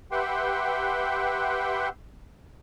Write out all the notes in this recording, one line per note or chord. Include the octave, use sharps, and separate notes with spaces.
G4 B4 E5 F#5 G5 C6